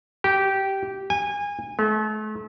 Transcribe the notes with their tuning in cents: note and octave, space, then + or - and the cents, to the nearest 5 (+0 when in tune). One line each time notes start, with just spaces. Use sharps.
G4 -15
G#5 -25
A3 -40